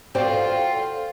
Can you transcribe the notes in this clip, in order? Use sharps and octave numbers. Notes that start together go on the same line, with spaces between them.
F4 F#4 A4 C5 D5 F5 G5